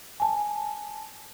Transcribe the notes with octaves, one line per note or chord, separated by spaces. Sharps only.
G#5 A5